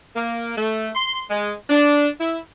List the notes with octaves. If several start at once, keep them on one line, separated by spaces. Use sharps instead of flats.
A#3
A3
C6
G#3
D4
E4